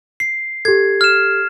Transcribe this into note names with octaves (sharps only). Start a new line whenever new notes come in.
C7
G4 A4 G#6
F6 E7